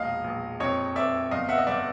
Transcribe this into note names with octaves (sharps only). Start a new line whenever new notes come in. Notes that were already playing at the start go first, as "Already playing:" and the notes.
Already playing: E1 A#1 D#5 F5
A#1
F2 C#5 D#5
F2 D5 E5
G1 D#5 F5
E5 F#5
D#5
G1 D5 E5